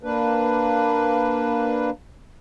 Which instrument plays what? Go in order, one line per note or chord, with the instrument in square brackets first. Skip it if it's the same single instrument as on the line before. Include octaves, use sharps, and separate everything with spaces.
[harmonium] A#3 D4 B4